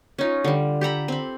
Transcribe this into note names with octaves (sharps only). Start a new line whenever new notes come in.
C#4 D#4 F4
D3 G3
G4 A4 A#5 B5
C4 B5